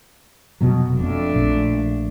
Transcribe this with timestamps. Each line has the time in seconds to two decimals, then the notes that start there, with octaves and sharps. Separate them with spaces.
0.61 F1 B2 F#3
0.99 F2 A3 D4
1.34 A#1